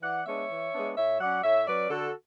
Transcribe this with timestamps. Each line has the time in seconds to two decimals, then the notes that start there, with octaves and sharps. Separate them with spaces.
0.02 E3 D5 F#5
0.26 G#3 B3 D4 C#5 E5
0.49 E3
0.73 G#3 B3 D4
0.96 A2 C#5 E5
1.20 F#3 C#4 D5 F#5
1.43 A2 C#5 E5
1.66 F#3 C#4 B4 D5
1.90 D3 F#4 A4